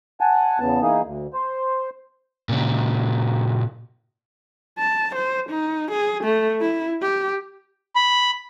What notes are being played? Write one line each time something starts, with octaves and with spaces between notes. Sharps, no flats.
F#5 G#5 A5
E2 C#3 B3 A5
E3 A#3 D#4 G#4
D2
C5
A#2 C#3
A5
C5
D#4
G#4
A3
E4
G4
B5